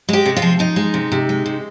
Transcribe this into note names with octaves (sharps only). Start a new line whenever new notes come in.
G#3 G4
C3
F4
F3
F3 D#4
G#3
C3
C3
G#3
C3